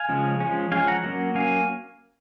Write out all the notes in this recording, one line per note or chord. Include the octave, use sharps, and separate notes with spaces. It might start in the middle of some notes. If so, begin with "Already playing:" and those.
Already playing: F5 G#5
C#3 F3 G#3 C#4
F3 G#3 C#4
F3 G#3 C#4 F5 G#5
F#5 A#5
F#3 A#3 C#4
F#3 A#3 C#4 F5 G#5